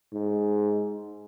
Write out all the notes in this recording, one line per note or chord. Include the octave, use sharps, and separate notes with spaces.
G#2